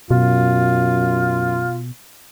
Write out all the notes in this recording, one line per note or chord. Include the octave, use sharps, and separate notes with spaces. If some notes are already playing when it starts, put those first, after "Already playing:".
F#2 B2 F4